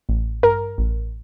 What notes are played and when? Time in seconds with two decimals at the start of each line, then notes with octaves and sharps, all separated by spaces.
0.09 A1
0.43 G2 A#4
0.78 A1